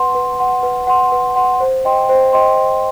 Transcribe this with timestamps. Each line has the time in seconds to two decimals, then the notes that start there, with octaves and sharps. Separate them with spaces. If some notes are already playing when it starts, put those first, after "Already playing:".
Already playing: B4 F#5 C6
0.15 B4
0.39 F#5 C6
0.63 B4
0.87 F#5 C6
1.12 B4
1.36 F#5 C6
1.60 C5
1.85 D#5 G5 C6
2.09 C5
2.33 D#5 G5 C6
2.57 C5